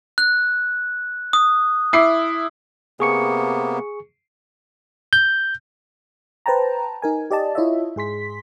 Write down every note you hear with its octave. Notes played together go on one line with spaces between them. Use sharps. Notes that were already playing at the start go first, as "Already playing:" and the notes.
F#6
D#6
E4 D6 C7
C3 A#3 B3 G#4 C#6 C#7
G6
B4 C5 G5 A5 A#5
D#4 A#4 G#5
G4 D5 D#5 A5
E4 F4 C#5 D#5 E5
G#2 G#4 C6 B6